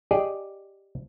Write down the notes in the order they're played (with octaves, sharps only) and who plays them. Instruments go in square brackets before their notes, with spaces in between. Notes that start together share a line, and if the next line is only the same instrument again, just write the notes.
[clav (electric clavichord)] G4 G#4 D5 D#5